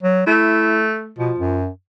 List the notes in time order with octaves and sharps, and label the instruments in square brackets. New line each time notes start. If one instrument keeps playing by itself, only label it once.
[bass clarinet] F#3
[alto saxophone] A3 [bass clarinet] E4
[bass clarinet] B2 [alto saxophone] F3
[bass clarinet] F#2